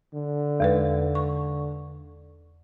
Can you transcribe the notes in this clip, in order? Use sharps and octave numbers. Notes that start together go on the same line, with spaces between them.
D3
E2 G#3 B4
C#6